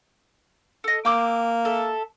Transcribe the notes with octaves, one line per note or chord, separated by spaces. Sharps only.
A4 D#5
A#3 G5 D6 E6
A4 E5